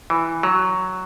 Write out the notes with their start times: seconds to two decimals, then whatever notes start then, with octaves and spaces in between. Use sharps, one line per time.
0.10 E3
0.43 F#3